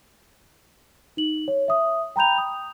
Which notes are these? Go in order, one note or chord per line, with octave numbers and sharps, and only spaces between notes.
D#4 F#7
C#5
E5 D#6
G5 A#5 B5 G6 F7
D#6